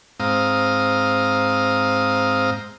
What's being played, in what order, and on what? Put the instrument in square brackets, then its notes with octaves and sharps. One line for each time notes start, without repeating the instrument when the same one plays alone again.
[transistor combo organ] G#2 C4 F5 A#5 D#6